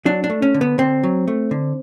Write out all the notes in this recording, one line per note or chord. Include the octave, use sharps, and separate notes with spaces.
F#3 D4
D4
A3
C#4
D3
B3
D3 C4
F#3
A3
D3